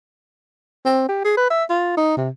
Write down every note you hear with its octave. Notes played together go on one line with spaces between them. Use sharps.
C4
G4
G#4
B4
E5
F4
D#4
C3